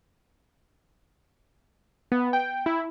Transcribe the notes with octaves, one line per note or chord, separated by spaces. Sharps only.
B3
G5
E4